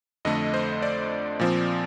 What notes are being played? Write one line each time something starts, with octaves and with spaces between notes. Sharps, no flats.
F2 D3 A3 D#5
C5
D5
A#2 F3 C4